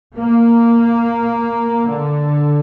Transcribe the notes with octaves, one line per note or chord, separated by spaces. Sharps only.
A#3
D3